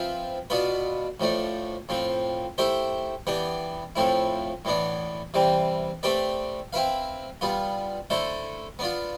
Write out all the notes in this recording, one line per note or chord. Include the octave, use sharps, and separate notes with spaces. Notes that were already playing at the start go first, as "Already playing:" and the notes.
Already playing: F3 C4 F4 B4 E5
B2 B3 D4 F4 B4
A2 F3 A3 D4
A2 F3 C4
A3 E4 G4 C5 E5
E3 B3 D4 G4
A2 F3 A3 C4 E4
A2 E3 B3 D4
C3 E3 G3 C4
A3 C4 G4 B4 D5
C4 E4 B4 F5
G3 B3 F4
D3 A3 E4 A4 C5
B3 D4 F4